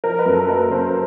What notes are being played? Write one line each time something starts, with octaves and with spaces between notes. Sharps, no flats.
F3 A#4
B4
F#2
A4
A#3 B4
C#3 C5